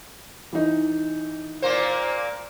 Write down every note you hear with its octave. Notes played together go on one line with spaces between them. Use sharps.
E3 D#4
A#2 A#3 C5